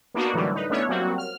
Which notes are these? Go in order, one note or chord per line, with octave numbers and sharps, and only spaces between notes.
A#3 B3 D4 D#4 F#4
A2 D3 E3 F#3 G3
D#4 B4
A3 B3 C#4 D4 E4 C#5
F#3 G3 A#3 C4 F#4
F6